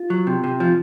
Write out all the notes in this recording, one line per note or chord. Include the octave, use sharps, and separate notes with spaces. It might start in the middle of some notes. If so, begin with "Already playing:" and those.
Already playing: F4
F#3
C3
C3
F3